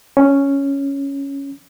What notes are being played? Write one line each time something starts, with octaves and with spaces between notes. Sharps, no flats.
C#4